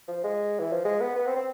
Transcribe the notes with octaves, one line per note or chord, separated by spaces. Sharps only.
F3
G#3
E3
F3
G#3
B3
B3
C4
C4